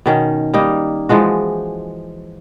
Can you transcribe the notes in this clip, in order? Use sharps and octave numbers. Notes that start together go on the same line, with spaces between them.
B2 D#3 C#4
G3 A#3 D#4
E3 F3 G#3 F#4